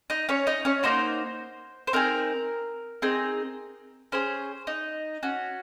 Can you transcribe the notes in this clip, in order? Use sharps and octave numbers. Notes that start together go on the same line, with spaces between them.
D#4 D#5
C#4 C#5
D#4 D#5
C#4 C#5
A#3 D#4 F#4 C5
C5
C4 D#4 G#4 A#4
C4 D#4 G#4
C#4 G#4 C5
D#4 D#5
C#4 F#4